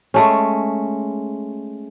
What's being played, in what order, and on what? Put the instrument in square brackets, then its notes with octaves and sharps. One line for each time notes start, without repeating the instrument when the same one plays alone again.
[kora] G#3 A3 C#4